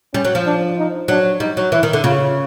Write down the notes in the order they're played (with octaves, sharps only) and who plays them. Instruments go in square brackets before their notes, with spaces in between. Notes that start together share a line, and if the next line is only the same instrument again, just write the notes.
[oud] G3 [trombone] C#4
[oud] F#3
F3
[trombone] D4
D#4
[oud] F#3 [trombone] D4
[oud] G3 [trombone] D#4
[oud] F#3
[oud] E3 [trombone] E4
[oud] D#3
D3
[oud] C#3 [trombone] F4